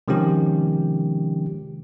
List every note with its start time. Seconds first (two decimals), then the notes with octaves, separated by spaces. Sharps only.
0.08 C3 D#3 F3 G#3 C#4 G4